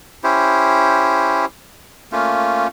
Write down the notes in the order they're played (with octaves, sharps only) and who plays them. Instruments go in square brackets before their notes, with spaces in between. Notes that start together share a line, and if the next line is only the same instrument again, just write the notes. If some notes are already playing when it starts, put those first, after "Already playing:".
[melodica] C#4 E4 G4 C5
A3 A#3 C#4 F4